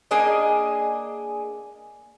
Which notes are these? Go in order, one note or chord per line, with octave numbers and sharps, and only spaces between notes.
A#3 D4 G#4 D#5